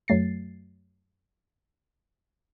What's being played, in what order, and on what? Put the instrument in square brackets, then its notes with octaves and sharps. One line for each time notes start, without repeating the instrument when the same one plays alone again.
[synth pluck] F#2 F#3 A3 A6 C7